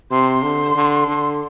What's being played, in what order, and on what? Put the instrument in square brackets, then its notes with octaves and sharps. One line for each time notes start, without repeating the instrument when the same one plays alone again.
[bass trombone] C3 [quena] C6
[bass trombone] D3
D3
D3